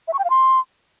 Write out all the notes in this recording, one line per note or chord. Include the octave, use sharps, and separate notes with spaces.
E5
C#6
G5
F5
C6